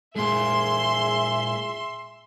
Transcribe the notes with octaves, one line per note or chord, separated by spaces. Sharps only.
A#2 G#3 G#4 E5 C6